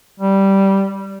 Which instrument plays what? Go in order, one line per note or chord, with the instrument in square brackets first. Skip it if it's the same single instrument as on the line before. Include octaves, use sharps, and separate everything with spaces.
[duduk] G3